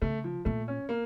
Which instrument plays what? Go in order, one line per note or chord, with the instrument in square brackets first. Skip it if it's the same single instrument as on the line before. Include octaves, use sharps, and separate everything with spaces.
[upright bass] C#3 [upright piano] A3
[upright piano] F3
[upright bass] A#2 [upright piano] A3
[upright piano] C#4
A#3